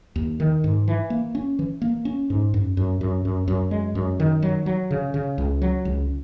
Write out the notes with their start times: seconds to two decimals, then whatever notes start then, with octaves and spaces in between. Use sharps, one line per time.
0.16 D#2
0.40 D#3
0.64 G#2
0.88 E3
1.10 A#3
1.35 C#4
1.59 E3
1.82 A#3
2.05 C#4
2.30 G#2
2.54 F#2
2.77 F#2
3.01 F#2
3.25 F#2
3.48 F#2
3.71 G#3
3.95 F#2
4.20 D#3
4.42 F#3
4.66 F#3
4.91 C#3
5.14 C#3
5.38 C#2
5.62 F#3
5.85 C#2